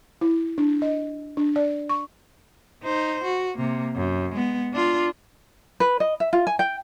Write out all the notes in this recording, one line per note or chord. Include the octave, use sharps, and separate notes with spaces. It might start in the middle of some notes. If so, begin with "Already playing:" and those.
E4
D4
D#5
D4
D5
C#6
D#4 C5
F#4
C3 A#3
F#2
G#3 B3
D4 F4
B4
D#5
E5
F4
G#5
G5